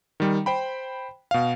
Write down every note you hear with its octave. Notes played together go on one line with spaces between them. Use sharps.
D#3 G3
C5 G5 B5
B2 F5